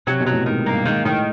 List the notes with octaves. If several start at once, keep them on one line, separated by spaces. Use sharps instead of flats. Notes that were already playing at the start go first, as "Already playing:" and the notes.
C3 F#3
B2
F#3
A2
G#2 D#3
G2 A#3
G#2 D#3
A2 D#3